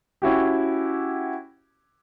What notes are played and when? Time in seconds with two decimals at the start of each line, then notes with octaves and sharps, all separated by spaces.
0.22 C#4 E4 F#4 G4